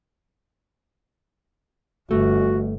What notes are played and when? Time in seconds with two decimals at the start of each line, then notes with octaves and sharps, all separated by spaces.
2.11 G1 A3 F#4